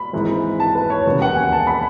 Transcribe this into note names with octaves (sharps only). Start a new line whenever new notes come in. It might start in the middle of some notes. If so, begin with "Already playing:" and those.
Already playing: B5
G#1 G#2 E3 G#3
A5
B4
C#5
E1 D#2 C#3
F#5
G#5
A5
B5